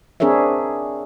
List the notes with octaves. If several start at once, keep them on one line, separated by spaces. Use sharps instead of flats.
C4 D4 G#4 A#4 C#5 E5